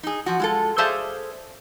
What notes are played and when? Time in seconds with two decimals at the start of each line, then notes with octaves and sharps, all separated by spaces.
0.03 D#4 G#4
0.26 F3 F#4
0.40 G#3 F4 A4
0.78 G#4 A4 C5 D5 E5 F5